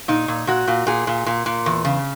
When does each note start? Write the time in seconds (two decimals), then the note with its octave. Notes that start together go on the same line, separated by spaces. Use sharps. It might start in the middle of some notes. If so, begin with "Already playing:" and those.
0.08 A#2 D#4
0.28 A#2
0.47 A#2 F#4
0.67 A#2
0.87 A#2 G#4
1.07 A#2
1.26 A#2
1.46 A#2
1.66 E2
1.85 C#3